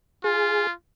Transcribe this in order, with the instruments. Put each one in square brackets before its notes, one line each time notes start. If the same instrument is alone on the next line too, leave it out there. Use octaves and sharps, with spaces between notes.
[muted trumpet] F4 [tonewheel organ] G#4